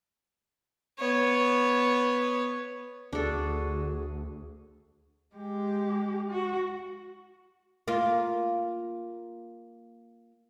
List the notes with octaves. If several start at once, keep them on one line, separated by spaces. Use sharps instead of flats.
B3 C#5
D2 D4 F#4 G#4 A4
G#3 G4
F#4
A#3 F4